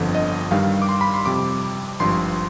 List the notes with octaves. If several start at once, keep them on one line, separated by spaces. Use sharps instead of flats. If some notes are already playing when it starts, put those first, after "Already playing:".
Already playing: G1 F2 D3 F3
D#5
G2 D#3 G3 F5
D6
C6
B5
C6
F2 C3 G3 D6
G#1 G2 F3 C6